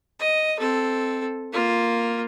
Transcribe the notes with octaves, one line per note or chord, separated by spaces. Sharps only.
D#5
C4 A4
A#3 F4